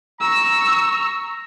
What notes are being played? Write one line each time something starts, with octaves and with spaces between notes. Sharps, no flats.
A#5 C#6 E6